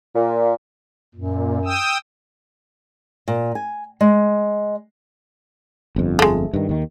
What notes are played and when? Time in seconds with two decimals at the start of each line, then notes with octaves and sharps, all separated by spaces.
0.15 A#2
1.15 F#2 A#2
1.65 G5 D#6 E6
3.28 A#2
3.55 G#5
4.01 G#3
5.96 G1 F2
6.19 G#3 A3
6.53 G2 D#3
6.69 D#2 D#3